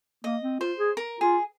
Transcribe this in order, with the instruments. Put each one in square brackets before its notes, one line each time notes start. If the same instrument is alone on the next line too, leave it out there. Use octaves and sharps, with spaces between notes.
[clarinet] A#3 [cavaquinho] D#5
[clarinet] C4
[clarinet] F4 [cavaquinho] C5
[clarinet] G#4
[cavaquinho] A#4
[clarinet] F4 [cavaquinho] G#4